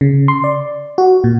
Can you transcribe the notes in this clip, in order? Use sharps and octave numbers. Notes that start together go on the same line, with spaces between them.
C#3
C6
D5
F#4
A#2